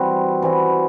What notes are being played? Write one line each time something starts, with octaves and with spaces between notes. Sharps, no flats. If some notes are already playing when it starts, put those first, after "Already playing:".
Already playing: E3 G3 C4 F#4
E3 G3 C4 F#4